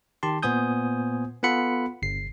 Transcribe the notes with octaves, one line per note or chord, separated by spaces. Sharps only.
D#3 G4 A5 C6
A#2 B3 C5 G#5 D#6 G6
B3 F4 A4 F#5 B5 C#7
G1 C7